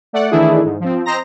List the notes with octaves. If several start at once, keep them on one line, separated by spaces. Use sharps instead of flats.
A3 D5 F#5
D#3 E3 A3 D4 E4 G#4
G#2
F3 C4
C4 C5 D#5 A#5 A#6